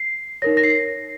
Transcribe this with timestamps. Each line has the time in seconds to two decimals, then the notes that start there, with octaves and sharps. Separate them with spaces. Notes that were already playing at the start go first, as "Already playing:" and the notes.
Already playing: C7
0.42 D#4 A#4 C#5 A#6
0.57 A#6
0.63 C7